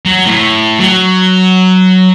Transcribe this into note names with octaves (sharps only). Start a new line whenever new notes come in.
F#3
A2
F#3